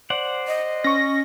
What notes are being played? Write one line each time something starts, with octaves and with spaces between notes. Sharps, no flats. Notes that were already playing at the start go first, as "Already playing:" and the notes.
C5 D5 F#5
D#5
C#4 C#6 A#6